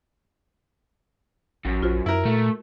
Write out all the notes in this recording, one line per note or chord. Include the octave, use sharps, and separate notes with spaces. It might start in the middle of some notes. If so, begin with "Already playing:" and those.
A1 F#2
A#1 F4 F#4 C5
F#2 E4 A#4
A#2 A3